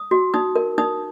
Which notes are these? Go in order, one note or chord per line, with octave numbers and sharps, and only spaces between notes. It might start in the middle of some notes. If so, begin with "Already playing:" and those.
Already playing: D#6
F#4
D#4 D#6
A#4
D#4 D#6